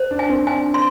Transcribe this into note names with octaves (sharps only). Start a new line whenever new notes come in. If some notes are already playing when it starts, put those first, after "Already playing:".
Already playing: C5
D4
G#5
C4
D4 G#5
C6